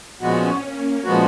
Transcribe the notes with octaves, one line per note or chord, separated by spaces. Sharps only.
A#2 F3 G#3 B3 C#4 F#4
A#3
A#2 F3 G#3 B3 F#4